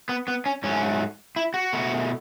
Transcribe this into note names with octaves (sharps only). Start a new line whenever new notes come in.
B3
B3
C#4
G#2 F#3 A3 C#4
E4
F#4
B2 A3